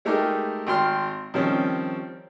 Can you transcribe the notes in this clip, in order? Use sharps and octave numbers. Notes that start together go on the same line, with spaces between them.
G#3 A3 D#4 G4 A#4
G#1 G5 C6 F6
D#3 F3 G3 C4 C#4